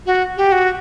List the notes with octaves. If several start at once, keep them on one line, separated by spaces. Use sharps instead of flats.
F#4
G4
F#4